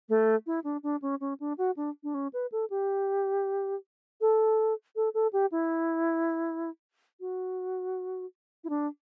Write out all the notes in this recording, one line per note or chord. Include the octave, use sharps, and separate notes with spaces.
A3
E4
D4
D4
C#4
C#4
D4
F#4
D4
D4
C#4
B4
A4
G4
A4
A4
A4
G4
E4
F#4
E4
D4